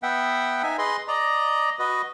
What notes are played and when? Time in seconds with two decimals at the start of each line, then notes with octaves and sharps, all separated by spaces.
0.03 B3 E5 F#5 G5
0.63 D#4 E5 G#5
0.79 G#4 B4 D#5 C6
1.08 D5 D#5 A#5
1.79 F#4 B4 D#5